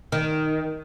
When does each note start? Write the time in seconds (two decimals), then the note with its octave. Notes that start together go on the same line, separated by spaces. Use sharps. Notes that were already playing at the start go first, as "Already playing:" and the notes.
0.12 D#3